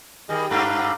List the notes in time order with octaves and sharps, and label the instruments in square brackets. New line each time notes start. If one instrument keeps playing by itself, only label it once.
[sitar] D#3 G3 [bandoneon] G#4 D#5
[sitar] G2 A3 D4 [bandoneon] F5 A#5 B5